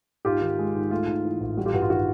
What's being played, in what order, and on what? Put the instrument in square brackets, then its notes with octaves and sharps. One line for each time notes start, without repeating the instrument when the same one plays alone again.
[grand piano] G#2 F4 G4
D#3
G#3
G#2
A3 F4
G#2
E3
A1
G3 F#4
F4 G4
G2 F#4
F4
D#3 F#4